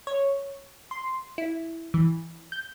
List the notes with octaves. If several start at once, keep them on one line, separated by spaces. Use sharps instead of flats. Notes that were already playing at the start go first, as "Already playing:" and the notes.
C#5
C6
E4
E3
G6